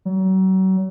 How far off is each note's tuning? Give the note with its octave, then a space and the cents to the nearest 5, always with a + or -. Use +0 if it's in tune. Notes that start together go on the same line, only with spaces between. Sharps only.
F#3 +35